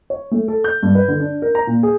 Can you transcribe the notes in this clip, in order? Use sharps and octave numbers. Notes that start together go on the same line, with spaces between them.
C#5
A3
A4
G6
G2
B4
D3
D4
A#4
A#5
A#2
G#4